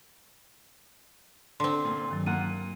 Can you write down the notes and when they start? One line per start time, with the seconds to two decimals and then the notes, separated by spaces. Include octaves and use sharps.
1.60 D3 C4 C6
1.85 A#2
2.09 G2 D#3 F#3
2.27 A#2 A#4 F#5 D#7